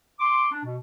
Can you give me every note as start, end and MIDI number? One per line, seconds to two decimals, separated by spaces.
0.20 0.48 84
0.20 0.48 86
0.52 0.63 62
0.64 0.77 47